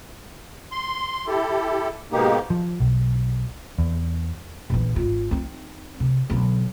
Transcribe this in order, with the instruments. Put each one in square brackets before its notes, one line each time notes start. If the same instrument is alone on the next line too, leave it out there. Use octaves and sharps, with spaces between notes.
[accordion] C6
E4 G4 A4
G#2 B2 A#3 D#4 G4
[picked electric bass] F3
B1
E2
[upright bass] A#1 E3
G#1 F4
C4 D#4
C3
B1 D3